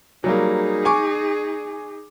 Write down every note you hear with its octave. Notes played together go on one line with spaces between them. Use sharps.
F#3 G3 A#3 D#4 G#4
G#5 C#6 D6